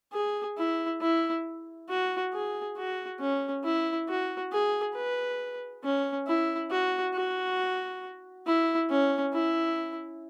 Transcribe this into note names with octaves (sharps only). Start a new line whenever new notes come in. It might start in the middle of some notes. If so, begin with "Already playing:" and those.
G#4
E4
E4
F#4
G#4
F#4
C#4
E4
F#4
G#4
B4
C#4
E4
F#4
F#4
E4
C#4
E4